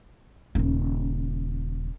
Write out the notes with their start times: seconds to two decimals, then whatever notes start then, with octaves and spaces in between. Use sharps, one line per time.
0.55 D#1 C#3